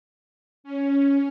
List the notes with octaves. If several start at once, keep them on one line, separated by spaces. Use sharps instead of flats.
C#4